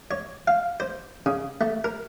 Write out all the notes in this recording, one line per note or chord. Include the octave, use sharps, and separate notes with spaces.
C#5
F5
C5
C#3
A3
A#4